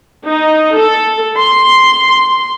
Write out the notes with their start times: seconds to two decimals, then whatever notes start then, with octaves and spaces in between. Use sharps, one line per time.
0.27 D#4
0.76 A4
1.37 C6